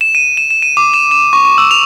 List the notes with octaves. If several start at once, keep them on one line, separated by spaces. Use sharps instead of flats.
E7
D#7
E7
E7
D#7
D6
E7
E7
C#6
C#6
E6
F7